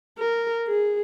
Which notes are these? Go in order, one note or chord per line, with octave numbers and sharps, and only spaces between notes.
A#4
G#4